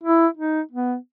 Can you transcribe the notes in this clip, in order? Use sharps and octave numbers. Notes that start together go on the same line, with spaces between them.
E4
D#4
B3